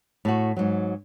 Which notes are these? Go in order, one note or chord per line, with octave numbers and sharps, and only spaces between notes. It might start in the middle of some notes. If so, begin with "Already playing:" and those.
A2 A3 F#4
G#2 F#3